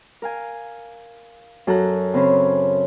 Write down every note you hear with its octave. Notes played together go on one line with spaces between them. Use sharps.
A#4 F5 G#5
F#2 A4 A#5 F#6
C#3 C4 C#4 B5